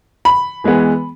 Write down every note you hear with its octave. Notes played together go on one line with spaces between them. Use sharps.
B5
E3 G#3 B3